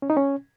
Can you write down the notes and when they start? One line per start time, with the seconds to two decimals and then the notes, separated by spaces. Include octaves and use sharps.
0.02 C#4
0.10 D#4
0.17 C#4